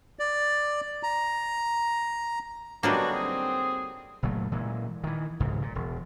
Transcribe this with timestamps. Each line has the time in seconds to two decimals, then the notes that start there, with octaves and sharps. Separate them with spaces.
0.19 D5
1.03 A#5
2.83 D3 F#3 G3 A#3 B3 D4 D#4 F#4
3.12 C4 G#4
4.23 F#1 A#2 F#3 A3
4.52 A#2 E3 G#3
5.04 D#3 E3
5.40 F1 C2 G#2 C#3
5.62 A#2
5.75 E1